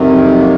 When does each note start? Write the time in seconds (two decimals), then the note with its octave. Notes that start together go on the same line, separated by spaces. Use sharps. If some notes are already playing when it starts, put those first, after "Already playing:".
Already playing: F2 C3 D#3 F#3
0.39 A#3